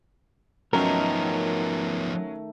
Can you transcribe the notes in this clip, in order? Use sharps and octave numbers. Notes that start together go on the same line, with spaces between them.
D#3 F3 F#3 A3 B3 C#4 A#4 G5